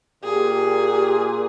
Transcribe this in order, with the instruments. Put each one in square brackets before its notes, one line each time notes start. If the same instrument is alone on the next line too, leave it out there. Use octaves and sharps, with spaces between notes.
[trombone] A#2 [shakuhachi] G4 [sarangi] G#4